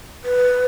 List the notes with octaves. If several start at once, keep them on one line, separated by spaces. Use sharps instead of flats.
B4